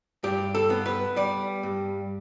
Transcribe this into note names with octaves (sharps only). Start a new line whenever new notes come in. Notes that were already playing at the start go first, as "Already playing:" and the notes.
G2 G4
A4
B3
B4
G3 D5
G2